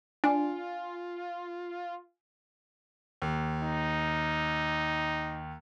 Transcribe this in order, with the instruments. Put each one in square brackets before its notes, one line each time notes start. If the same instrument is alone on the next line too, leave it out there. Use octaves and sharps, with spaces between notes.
[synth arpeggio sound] D4 [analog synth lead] F4 [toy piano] G#5
[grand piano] D#2
[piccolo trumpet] D#4